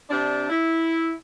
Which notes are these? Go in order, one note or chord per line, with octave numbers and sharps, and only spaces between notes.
C3 D4
E4